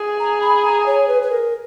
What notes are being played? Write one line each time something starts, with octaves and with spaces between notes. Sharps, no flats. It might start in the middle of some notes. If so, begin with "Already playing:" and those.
Already playing: G#4
A#5
B5
A#5
C#5
B4
B4
A#4